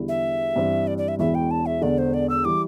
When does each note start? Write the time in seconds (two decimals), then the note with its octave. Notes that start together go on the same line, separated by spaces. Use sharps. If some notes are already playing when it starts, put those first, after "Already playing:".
Already playing: E2 D3 G3 E4
0.09 E5
0.56 G2 E3 C4 G4 C5
0.87 D5
0.98 D5
1.08 E5
1.19 E1 E2 E3 E5
1.35 G5
1.51 A5
1.66 E5
1.81 E1 E2 D3 D5
1.98 C5
2.14 D5
2.30 E6
2.45 E3 G3 D6